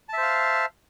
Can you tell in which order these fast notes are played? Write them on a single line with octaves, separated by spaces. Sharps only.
A5 E5 C5 F5